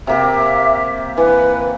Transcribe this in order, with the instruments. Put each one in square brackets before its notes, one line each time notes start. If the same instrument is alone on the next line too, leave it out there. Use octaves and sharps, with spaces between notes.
[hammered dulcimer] C3 A#3 G4 [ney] E5
[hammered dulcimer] E3 [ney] B4